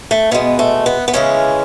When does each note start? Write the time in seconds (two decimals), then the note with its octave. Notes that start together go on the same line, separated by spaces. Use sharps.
0.11 A3
0.31 B2 G#3 B3
0.59 A3
0.86 B3
1.08 B3
1.13 C#3 E3 G#3 C#4